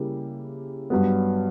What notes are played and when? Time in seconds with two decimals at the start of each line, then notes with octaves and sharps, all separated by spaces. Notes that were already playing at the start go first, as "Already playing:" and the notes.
Already playing: C#3 G3 A#3 E4 G4
0.90 G2 F#3 B3